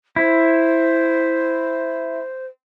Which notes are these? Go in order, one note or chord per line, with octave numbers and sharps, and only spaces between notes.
E4 C5